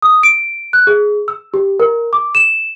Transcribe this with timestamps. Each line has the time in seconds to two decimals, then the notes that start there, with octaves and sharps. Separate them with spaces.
0.02 D#6
0.23 D7
0.73 F#6
0.87 G#4
1.28 E6
1.54 G4
1.80 A#4
2.13 D6
2.35 E7